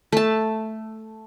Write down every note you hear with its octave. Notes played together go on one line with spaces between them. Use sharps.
A3 A5